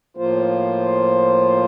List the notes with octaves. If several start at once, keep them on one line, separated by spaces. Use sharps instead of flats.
A2 F3 A#3 F4 C5